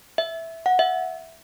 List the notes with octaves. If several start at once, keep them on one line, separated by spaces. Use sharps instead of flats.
E5
F#5
E5